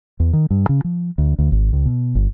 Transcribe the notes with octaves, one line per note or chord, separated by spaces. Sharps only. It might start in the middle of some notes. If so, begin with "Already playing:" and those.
E2
D#3
G2
C#3
F3
D2
D2
G#1
C#2
B2
G1